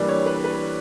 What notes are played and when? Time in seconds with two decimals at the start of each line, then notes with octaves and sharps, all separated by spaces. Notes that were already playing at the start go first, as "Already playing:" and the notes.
Already playing: E3 G3 A#3 D4 D5
0.09 C#5
0.26 B4
0.44 B4